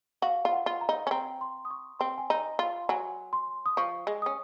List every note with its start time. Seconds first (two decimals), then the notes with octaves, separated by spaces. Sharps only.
0.22 F#4 F5
0.45 F4
0.53 F#5
0.66 F4
0.81 A#5
0.89 D#4
1.07 C#4
1.11 C4 A#5
1.41 C6
1.65 D#6
1.71 C#6
1.99 C4 C6
2.18 G#5
2.30 D#4 A#5
2.59 F4 C6
2.89 F#3 G#5
3.33 C6
3.66 D#6
3.77 F3 C#6
4.07 G#3
4.22 C#4 D#6